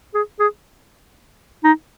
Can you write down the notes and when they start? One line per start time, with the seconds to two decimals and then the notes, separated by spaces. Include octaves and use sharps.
0.15 G#4
0.40 G#4
1.64 D#4